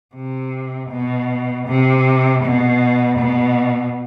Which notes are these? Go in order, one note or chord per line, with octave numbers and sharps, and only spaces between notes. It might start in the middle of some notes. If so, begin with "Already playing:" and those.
C3
B2
C3
B2
B2